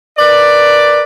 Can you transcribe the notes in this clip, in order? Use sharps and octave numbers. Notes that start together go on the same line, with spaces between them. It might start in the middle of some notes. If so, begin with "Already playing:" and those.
A#4 B4 D5